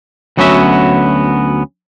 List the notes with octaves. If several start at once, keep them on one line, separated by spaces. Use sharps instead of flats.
D2 F#3 B3 C#4 F#4 E5